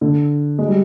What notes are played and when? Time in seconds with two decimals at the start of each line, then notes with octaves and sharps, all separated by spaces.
0.01 D3
0.59 G#3
0.68 G3